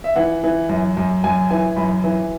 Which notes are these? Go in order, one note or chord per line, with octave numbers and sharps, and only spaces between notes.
E5
E3 F#5
E3
F#2
F#2
F#2 G#5
E3 G#5
F#2 B5
E3